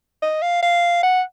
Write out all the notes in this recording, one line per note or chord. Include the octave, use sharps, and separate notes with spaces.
D#5
F5
F5
F#5